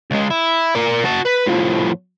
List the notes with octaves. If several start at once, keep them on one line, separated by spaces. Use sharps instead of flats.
C#2 G#3
E4
A#4 D5
F#4 A5
B4
A2 F3